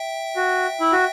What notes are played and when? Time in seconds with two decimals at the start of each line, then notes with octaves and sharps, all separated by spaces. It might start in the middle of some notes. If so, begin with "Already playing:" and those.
Already playing: E5 G5
0.36 F#4
0.80 E4
0.92 F#4